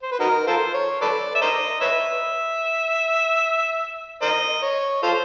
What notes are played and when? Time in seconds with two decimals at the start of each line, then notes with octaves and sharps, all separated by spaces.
0.03 C5
0.12 B4
0.20 D#4 F#4 A#4
0.47 F4 A4 C5
0.74 C#5
1.01 A4 B4 D5
1.35 E5
1.41 A#4 C5 D#5
1.81 B4 C#5 E5
4.22 A#4 C5 D#5
4.62 C#5
5.03 F4 A4 C5